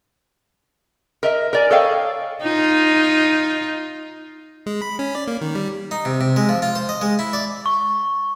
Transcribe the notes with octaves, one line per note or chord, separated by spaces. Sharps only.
A#4 D#5 E5
A#4 D5 G#5
A4 A#4 C#5 D#5 F5 G5
D#4 F4
G#3
B5
C#4
D5
A#3
D#3
G3
D#4
C3
C3
G#3
F3
F4
C5
D#5
G#3
E4
D5
C#6